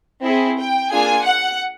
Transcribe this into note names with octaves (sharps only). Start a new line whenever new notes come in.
C4 E4 G#4
G5
A#3 D4 F4 G#4 G#5
F#5